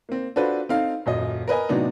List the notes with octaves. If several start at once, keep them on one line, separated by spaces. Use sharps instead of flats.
A#3 C4
D4 F4 F#4 A4 B4 C5
C4 D#4 A4 F5
D#1 F#2 D#5
A#4 B4 D#5 G#5
A2 C3 F#3 B3 D4 D#4